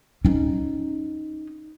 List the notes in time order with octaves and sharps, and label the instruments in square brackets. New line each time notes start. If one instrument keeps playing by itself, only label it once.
[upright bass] C#4 D#4